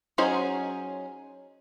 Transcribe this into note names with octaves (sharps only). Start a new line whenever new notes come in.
F#3 C#4 D#4 G#4 C5